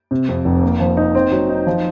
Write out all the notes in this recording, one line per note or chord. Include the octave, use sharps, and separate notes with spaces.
C3
F2
F1
A#3
F3
D#4
C4
F#3
D#4
F3